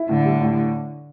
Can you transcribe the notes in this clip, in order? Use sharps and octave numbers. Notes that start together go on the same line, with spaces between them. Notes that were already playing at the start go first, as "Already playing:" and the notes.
Already playing: E4
A2 D3
G3
A2